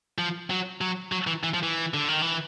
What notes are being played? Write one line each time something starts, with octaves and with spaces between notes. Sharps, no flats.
F3
F#3
F#3
F#3
E3
E3
F3
E3
D3
D#3
E3